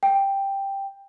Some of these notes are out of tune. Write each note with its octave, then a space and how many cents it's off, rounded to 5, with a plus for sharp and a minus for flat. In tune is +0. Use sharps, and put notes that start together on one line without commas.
G5 +5